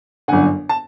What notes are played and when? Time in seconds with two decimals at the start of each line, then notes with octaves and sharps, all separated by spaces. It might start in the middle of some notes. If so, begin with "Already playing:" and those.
0.28 G1 F#2 D3 F#5 G#5
0.69 A5